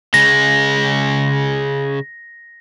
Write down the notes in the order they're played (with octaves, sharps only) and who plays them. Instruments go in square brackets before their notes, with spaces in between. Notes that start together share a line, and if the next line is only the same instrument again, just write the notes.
[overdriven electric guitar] C#3 G#3 [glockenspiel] A#6